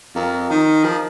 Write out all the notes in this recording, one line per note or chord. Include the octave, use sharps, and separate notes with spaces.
F2 A#4
D#3 D#4
F3 A#4